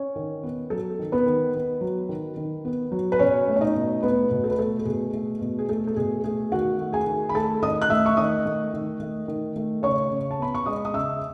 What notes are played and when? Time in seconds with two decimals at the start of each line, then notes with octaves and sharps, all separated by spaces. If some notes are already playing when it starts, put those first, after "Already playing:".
Already playing: C#4 C#5
0.16 D#3
0.43 B3
0.70 F#3 A4
0.99 D#3
1.12 B3 B4
1.26 D#3
1.54 B3
1.81 F#3
2.09 D#3
2.37 D#3
2.65 B3
2.92 F#3
3.12 B4
3.19 B2 C#4 C#5
3.48 A3
3.56 C#5
3.61 D#4 D#5
3.75 B2
4.03 A3 B3 B4
4.31 B2
4.44 A4
4.51 B4
4.58 A3 A4
4.79 A4
4.85 B2 G#4
5.14 A3
5.41 B2
5.59 G#4
5.69 A3 A4
5.87 A4
5.96 B2 G#4
6.24 A3 G#4
6.52 D#3 F#4 F#5
6.80 A3
6.93 G#4 G#5
7.06 D#3
7.29 B5
7.35 A3 A4 A5
7.63 D#3 D#5 D#6
7.82 F#6
7.90 A3 E5 E6
8.06 C#6
8.17 D#3 D#5 D#6
8.45 A3
8.73 D#3
9.00 A3
9.28 D#3
9.56 A3
9.83 C#3 C#5 C#6
10.11 C#3
10.31 A5
10.39 B3 B5
10.55 C#6
10.66 G#3 D#5 D#6
10.85 D#6
10.94 C#3 E5 E6